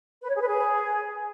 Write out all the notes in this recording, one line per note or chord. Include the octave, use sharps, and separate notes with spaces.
B4
C#5
G#4
B4
G#4